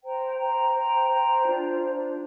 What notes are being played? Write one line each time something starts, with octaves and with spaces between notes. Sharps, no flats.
C5 G5 A#5
C5 G5 A#5
C5 G5 A#5
C5 G5 A#5
D4 F4 C5
D4 F4 C5